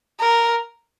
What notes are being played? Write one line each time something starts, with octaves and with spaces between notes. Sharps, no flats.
A#4